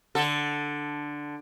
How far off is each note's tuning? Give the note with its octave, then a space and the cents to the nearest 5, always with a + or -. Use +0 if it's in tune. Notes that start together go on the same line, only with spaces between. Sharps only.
D3 +0 A4 +0